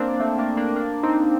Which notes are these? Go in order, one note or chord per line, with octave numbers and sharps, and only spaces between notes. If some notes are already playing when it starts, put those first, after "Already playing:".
Already playing: A#3 C4 D4
A3 C4
A#3 D4
A#3 D4
A#3 D4
C4 D#4